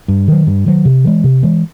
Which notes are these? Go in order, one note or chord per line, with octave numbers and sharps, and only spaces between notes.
G2
D#3 F#3
G2
D#3 F#3
C3
E3 G#3
C3
E3 G#3